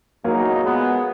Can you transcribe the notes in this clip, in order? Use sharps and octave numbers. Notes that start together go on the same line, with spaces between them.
E2 C#3 F#3 G#3 A#3 D#4 F#4
A#2 G#3 B3